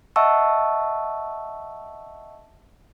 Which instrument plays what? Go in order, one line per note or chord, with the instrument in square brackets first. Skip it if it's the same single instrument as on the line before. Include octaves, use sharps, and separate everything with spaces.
[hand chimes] D#5 E5 F#5 A5 C#6 E6